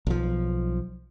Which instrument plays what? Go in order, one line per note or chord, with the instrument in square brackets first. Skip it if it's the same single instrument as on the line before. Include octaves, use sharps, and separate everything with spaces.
[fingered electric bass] B1 F3